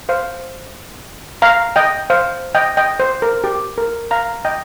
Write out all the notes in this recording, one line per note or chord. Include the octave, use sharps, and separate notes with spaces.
C5 F5
F5 A#5
D#5 G5
C5 F5
D#5 G5
D#5 G5
C5
A#4
G4
A#4
F5 A#5
D#5 G5